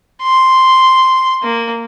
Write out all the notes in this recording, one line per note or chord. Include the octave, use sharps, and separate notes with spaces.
C6
A#3